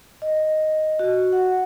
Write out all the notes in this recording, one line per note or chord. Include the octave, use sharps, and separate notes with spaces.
D#5
F#4
F#5